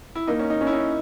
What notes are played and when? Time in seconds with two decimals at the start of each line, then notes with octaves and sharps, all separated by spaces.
0.15 E4
0.27 A#3 D#4
0.39 C#4
0.50 D#4
0.61 C#4
0.67 E4
0.72 D#4